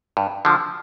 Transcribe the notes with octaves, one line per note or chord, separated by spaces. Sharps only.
G2
D3 F3